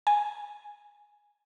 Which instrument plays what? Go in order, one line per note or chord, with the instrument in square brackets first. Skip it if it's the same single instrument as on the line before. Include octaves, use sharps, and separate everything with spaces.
[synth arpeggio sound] G#5